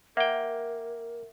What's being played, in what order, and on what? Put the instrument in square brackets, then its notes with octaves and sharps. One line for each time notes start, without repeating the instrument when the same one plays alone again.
[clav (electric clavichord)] A#3 G5 [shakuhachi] A#4 [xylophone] E5 F#5